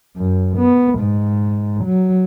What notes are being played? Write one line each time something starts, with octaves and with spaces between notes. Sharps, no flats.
F#2
B3
G#2
F#3